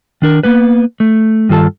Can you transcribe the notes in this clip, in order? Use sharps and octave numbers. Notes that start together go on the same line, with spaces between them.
D#3 D4 A#4
A#3 B3 B4
A3
G2 D#3 F4 A4 A5